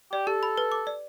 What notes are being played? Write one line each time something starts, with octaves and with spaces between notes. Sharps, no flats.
G4 D5
G4 A4
B5
B4
D6
D5